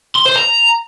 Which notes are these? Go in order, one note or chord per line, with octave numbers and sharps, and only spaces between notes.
C6
C5
A#5